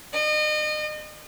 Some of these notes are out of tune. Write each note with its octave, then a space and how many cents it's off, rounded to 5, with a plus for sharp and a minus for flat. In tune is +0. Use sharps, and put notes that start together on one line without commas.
D#5 -35